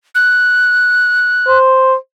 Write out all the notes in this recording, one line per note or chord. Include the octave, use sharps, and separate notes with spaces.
F#6
C5